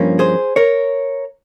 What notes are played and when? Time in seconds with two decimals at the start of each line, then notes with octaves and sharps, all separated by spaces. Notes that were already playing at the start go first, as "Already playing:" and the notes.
Already playing: G2 F3 A#3 C#4
0.19 G#4 C5
0.56 A#4 C#5